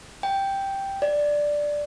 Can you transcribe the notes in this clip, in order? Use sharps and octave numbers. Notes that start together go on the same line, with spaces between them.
G5
D5